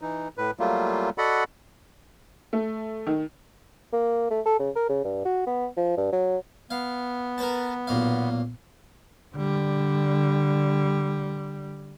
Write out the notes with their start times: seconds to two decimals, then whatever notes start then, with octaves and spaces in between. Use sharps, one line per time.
0.02 E3 D#4
0.38 A2 B4
0.59 F#3 G3 A3 A#3 F4
1.18 F#4 A4 D5 D#5 F#5 B5
2.53 A3
3.07 D#3
3.93 A#3
4.31 A3
4.45 A4
4.59 C#3
4.76 A#4
4.89 C#3
5.04 G2
5.25 F#4
5.47 B3
5.77 F3
5.97 G2
6.12 F#3
6.71 B3 F5
7.38 A#4 B4 A5
7.87 B1 A#2 F5
9.34 D3 G3